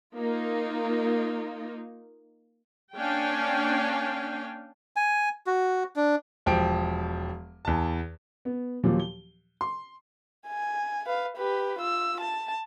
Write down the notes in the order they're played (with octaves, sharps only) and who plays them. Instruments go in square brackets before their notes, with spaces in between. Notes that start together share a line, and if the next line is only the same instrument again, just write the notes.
[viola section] A#3 D#4 F4
A#3 C#4 D4 F5 G5 G#5
[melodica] G#5
F#4
D4
[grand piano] E1 F3 G4 D7
E2 A5
[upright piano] B3
D#2 A#2 F3 F#3
G7
C6
[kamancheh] G#5
B4 F5
G4 B4
F4 E6
A5